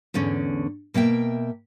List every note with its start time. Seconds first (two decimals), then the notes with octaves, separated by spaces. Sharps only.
0.14 E2 G#2 D3 C#4
0.94 B2 A#3 E5 G5